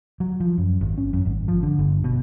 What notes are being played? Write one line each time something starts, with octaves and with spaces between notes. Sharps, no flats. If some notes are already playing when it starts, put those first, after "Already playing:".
F#3
F3
F#2
G#1
C#4
F#2
G#1
F3
D3
G1
B2